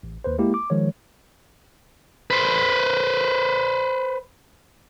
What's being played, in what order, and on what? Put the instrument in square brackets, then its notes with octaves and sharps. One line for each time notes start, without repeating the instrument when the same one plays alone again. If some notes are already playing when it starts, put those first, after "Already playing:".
[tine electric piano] A1
D#2 B4 C5
G#3 A#3 E4 G4
D6
D#3 F3 G#3 C#5
[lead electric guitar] B4 C5